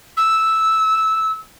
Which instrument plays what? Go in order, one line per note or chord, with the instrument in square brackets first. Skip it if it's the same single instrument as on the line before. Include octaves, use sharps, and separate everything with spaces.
[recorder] E6